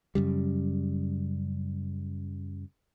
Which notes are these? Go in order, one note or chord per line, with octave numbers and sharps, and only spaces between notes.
F#2 C#3 G3